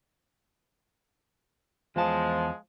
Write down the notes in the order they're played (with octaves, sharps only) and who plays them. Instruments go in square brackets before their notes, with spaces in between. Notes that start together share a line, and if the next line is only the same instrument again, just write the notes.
[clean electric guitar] E2 A5 [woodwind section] F3 G#3